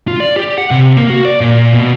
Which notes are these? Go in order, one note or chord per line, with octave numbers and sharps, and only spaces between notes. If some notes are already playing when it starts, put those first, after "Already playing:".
F4
D5
G4
F#5
C3
A#3
F#4
D5
A#2
B2